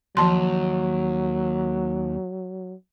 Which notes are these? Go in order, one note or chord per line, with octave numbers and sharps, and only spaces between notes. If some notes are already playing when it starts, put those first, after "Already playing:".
D#2 F3 F#3 A5 C6